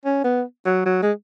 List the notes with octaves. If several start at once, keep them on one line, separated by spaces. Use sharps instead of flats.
C#4
B3
F#3
F#3
G#3